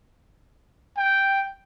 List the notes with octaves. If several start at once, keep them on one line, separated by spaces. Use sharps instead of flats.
G5